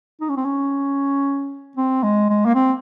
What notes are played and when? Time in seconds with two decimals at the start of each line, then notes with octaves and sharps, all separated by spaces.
0.21 D#4
0.29 C#4
0.37 C4
0.45 C#4
1.77 C4
2.03 G#3
2.30 G#3
2.45 A#3
2.55 C4